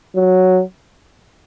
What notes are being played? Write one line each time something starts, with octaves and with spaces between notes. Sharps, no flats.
F#3